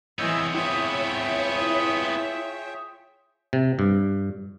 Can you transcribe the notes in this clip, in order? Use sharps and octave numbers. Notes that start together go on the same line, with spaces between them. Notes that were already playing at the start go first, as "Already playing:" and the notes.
E3 G#3 B3 C4 C#5 D#5 E6 G6
E4 F4 G#4 C#5 E5 G5
C3
G2